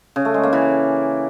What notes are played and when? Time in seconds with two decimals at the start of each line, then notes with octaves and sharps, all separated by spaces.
0.16 C#3
0.25 A3
0.34 G#3
0.43 A#3
0.53 E3